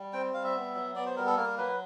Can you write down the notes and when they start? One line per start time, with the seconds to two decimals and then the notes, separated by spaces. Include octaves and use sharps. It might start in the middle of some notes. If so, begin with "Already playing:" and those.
Already playing: G3
0.13 C4 G5
0.34 G3 F5
0.44 E5
0.55 B3
0.75 F#3
0.95 B3 D5
1.06 C5
1.16 G3 A#4
1.27 A4
1.37 A#3 A#4
1.58 F#3 B4